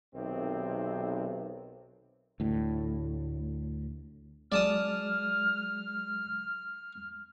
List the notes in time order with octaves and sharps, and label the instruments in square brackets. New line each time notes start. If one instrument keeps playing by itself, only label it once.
[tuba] B1 [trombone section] C3 D#3 C4
[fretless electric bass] D2 A2
[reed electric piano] F#3 G#3 [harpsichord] D5 A5 D#6 [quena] F6